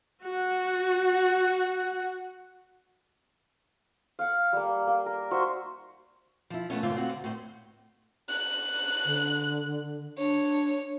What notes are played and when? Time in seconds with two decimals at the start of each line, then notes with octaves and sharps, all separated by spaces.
0.22 F#4 F#5
4.19 F5 F#5
4.53 G3 A#3
4.87 A#3
5.06 A#4
5.31 D#4 F#4 C5 E5
6.50 F3 E4
6.70 A3 B3 C#4
6.83 G#2 D3 A3 C4 F4
6.96 C4 F#4
7.09 D2
7.24 A2 C5
8.29 F#6
9.05 D3
10.18 D4 C#5